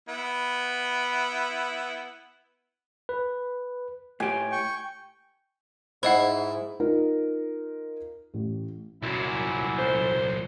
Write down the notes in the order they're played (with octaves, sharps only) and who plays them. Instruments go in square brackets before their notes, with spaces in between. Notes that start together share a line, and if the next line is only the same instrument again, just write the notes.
[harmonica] B3 E4
[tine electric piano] B4
[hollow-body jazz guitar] A2 G4 [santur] G#5
[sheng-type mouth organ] G5 C#6
[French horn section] G#2 [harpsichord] E4 [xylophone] C5 D#5 F#5
[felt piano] D#4 F4 A#4
A1
[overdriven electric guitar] C2 A#2 [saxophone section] F#2 E4
[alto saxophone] C5